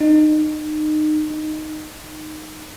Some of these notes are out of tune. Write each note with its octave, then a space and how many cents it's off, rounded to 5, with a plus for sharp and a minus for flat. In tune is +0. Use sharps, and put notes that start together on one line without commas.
D#4 -25
D#4 -10